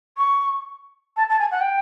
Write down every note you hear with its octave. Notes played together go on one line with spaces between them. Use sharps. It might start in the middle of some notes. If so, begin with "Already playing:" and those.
C#6
A5
A5
G#5
F#5
G5